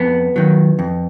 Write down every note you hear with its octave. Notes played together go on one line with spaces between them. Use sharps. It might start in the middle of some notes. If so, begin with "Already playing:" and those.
Already playing: F2 B3
D#3 F#3
F2